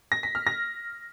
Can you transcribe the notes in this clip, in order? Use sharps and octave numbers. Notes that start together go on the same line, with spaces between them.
A#6
B6
F6
A#6